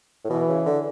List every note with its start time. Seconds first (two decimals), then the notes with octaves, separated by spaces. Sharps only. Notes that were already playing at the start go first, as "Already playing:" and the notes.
0.24 A2
0.29 B2 E3
0.48 C#3
0.66 D3